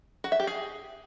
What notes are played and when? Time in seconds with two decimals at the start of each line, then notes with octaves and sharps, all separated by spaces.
0.24 F#4
0.32 E5
0.40 G4
0.47 G#4